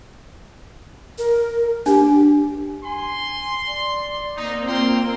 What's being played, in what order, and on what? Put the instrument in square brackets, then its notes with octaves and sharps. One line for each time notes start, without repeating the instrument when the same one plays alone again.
[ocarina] A#4
[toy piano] D4 [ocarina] G4
[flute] G#5 [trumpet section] C6
[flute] D5
[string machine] A#3 C4 [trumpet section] D#4
[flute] F4 [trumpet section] G5 A#5 C6